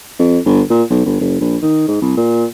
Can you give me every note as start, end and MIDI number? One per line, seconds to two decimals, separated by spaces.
0.19 0.39 41
0.45 0.62 31
0.70 0.83 46
0.91 1.03 35
1.06 1.20 31
1.21 1.41 30
1.41 1.57 34
1.62 1.88 51
1.88 2.00 44
2.02 2.17 36
2.17 2.45 46